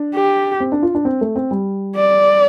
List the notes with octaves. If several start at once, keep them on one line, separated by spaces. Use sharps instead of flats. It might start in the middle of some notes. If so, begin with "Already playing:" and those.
Already playing: D4
G4
C4
D4
F4
D4
C4
A3
C4
G3
D5